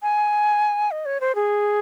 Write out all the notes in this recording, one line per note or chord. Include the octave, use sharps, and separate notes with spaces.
G#5
D#5
C#5
C5
G#4